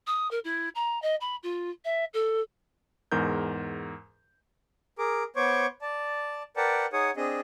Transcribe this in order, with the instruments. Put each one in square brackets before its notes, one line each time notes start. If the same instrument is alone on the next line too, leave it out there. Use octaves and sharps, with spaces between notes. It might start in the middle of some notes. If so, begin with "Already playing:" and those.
[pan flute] D#6
A#4
E4
A#5
D#5
B5
F4
E5
A4
[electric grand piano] E2 G#2 A#4 G6
[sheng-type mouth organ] G#4 A#4 D6
B3 C5 C#5 C#6 D6
D5 A5
A#4 B4 D5 F#5 G5 A5
D#4 G#4 C#5 F#5 D#6
C4 D4 G#4 D#5